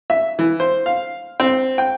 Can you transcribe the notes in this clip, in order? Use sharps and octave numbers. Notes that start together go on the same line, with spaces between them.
E5
E3
C5
F5
C4
G5